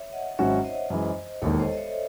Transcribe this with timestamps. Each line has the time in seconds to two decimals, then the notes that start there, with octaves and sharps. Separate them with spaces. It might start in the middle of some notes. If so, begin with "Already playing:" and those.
Already playing: C#5 E5
0.12 D#5 F#5
0.38 G#1 G#2 F#3 C#4 F#4 C#5 E5
0.64 C5 D#5
0.90 F#2 E3 G#3
1.42 E1 D#2 D#3 A4 C#5
1.60 C5 D#5
1.73 D#5
1.77 C#5 E5